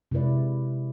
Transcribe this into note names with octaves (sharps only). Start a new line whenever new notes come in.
C3 G#3 E4 B4 D5